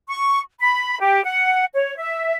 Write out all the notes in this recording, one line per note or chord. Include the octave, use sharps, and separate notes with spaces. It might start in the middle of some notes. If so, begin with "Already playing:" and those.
C#6
B5
G4
F#5
C#5
E5